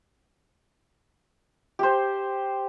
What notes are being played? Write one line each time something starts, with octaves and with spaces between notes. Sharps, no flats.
G4 C5